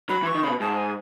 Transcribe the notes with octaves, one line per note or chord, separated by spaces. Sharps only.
F#3 B5
E3
C#6
D#3
B2 C#3 B5
G#2 A5
G#5